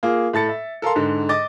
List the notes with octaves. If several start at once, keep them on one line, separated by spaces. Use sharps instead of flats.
A#3 F4 G#4
A2 A5 A6 C#7
E5
A4 A#4 F5 C6
G#2 D3
D#5 D6 A6